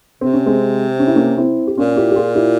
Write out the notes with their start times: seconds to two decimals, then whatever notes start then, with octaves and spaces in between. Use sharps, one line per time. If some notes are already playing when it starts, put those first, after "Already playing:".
0.21 C3 C4
0.33 C#4
0.46 G#3 C4
0.99 C#4
1.07 E4
1.16 A#3 C#4
1.38 C4 E4
1.67 G4
1.77 A#2 C#4 F4
1.96 E4 G4
2.11 G4
2.16 F4 G#4
2.35 E4 G4